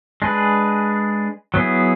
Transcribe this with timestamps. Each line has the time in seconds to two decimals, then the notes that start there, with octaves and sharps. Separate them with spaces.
0.22 G#3 D4 G#4 B4
1.54 F#3 B3 E4 G#4